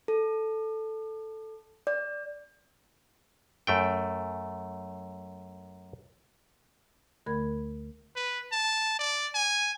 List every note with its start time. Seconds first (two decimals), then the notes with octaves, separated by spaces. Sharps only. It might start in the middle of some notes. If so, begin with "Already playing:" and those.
0.08 A4
1.87 D5
3.67 F#2 A3 G5
7.26 D2 D3 A3 A#4 B5 G#6
8.16 B4
8.52 A5
8.99 D5
9.35 G#5